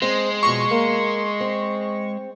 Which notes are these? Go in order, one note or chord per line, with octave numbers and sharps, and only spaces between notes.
G#3 C4 C6
F2 B2 C#6
A#3
C4